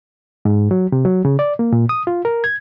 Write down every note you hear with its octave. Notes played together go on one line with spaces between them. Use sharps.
G#2
F#3
C3
F#3
C#3
D5
A#3
A#2
D#6
F4
A#4
G#6